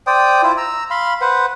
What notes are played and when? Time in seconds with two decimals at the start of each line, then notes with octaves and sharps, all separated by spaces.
0.07 C5 D5 G5 D#6
0.43 E4 F4 C5
0.58 A#5 E6
0.91 F5 B5 C6
1.21 B4 C5 F#5